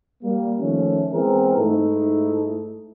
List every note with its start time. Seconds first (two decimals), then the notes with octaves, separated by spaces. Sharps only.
0.23 G3 A#3
0.59 D#3 F3 A3 C#4
1.13 E3 G#3 B3 C4 G#4 A#4
1.56 G#2 A3 D#4 E4 A4